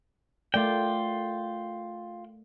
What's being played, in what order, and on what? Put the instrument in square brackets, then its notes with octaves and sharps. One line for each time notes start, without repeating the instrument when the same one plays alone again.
[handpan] A3 A#4 D5 [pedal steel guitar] F4 G5